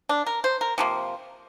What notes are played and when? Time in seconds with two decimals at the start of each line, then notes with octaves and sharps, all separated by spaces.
0.09 D4
0.26 A#4
0.44 C5
0.61 A#4
0.78 C3 F3 A#3